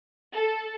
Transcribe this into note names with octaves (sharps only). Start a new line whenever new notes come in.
A4